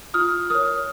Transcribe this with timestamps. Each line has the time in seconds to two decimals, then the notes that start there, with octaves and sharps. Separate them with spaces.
0.14 F4 D#6 F6
0.50 A#4 C#5 D#6 F6